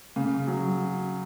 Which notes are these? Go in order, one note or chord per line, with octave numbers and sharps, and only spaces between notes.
C#3
F#3